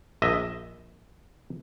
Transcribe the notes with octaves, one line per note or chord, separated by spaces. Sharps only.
A#1 D#5 E5